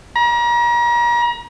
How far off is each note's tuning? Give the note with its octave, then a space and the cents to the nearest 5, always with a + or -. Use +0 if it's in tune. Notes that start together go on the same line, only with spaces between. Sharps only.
A#5 +35